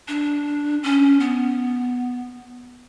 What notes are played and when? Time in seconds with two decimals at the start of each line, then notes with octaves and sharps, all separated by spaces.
0.08 D4
0.83 C#4
1.20 B3